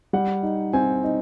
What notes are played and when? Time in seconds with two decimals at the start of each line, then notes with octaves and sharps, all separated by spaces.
0.13 G3 F#5
0.43 D#4
0.73 C4 G#5
1.03 D#4